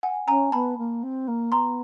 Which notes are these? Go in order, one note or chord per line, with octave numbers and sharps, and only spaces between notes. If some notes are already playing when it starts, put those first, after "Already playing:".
F#5 G#5
C#4 G#5 A#5
B3 A5 B5
A#3
C4
A#3
B3 A#5 C6